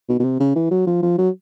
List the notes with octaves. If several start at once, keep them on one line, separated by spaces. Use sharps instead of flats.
B2
B2
C3
C#3
E3
F#3
F3
F3
F#3